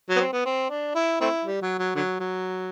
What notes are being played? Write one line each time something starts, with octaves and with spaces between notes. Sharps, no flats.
F#3
B3
C4
B3
C4
D4
E4
A3 C4 E4
G3
F#3
F#3
D3 F#3
F#3